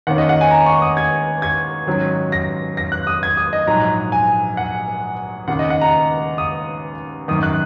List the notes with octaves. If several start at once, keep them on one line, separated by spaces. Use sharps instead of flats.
D#2 D#3 A#3 C#4 F#5
D#5
F#5
G#5
A#5
C#6
D#6
G#6
G#6
G#2 D#3 F#3 C#4
A#6
A#6
F#6
D#6
G#6
D#6
D#5
A#1 G#2 F#3 A#5
G#5
F#5
D#2 C#3 A#3 F#5
D#5
F#5
A#5
D#6
G#1 F#2 D#3 D#6
F#6